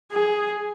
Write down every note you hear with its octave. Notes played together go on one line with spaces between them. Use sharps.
G#4